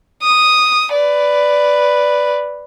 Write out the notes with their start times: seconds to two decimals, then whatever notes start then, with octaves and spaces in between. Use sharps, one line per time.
0.23 D#6
0.93 B4 D5